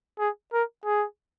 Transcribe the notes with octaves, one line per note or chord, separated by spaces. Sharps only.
G#4
A#4
G#4